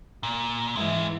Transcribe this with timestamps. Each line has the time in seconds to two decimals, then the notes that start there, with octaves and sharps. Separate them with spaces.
0.23 A#2
0.76 G#2 E3 G#3 E4